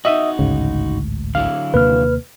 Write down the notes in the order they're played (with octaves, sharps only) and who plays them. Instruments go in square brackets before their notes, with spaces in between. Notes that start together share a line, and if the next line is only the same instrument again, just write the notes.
[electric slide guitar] D#4 F#4 [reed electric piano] D#5 E5 D#6
[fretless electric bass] A1 D2 G#2 [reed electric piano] C#3
[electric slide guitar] D3 F#3 E4 [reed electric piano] F5
[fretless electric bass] D#2 C3 A#3 [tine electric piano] B4 F6